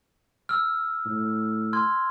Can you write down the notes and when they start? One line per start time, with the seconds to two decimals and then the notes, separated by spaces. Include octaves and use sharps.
0.49 E6 F6
1.05 A2
1.73 C6 F6 G#6